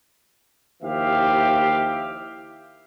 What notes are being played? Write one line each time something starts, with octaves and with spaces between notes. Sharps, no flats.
D#2 F3 E4 G4 E5 F5